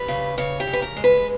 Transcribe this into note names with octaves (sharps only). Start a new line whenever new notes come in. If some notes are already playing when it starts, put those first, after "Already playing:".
Already playing: G3 B4
C#3
C#3 C#5
G4
C#3
B4
A#4
G#3
B4